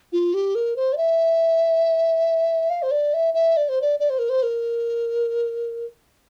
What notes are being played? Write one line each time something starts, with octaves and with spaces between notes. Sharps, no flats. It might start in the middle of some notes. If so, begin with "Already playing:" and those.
F4
G4
A#4
C5
D5
E5
F5
C5
D5
E5
E5
D5
C5
D5
D5
C5
A#4
C5
A#4